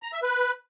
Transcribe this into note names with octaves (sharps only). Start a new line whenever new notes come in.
A#5
E5
B4